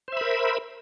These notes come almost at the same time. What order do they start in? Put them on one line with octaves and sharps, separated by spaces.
C5 E5 B5 A#4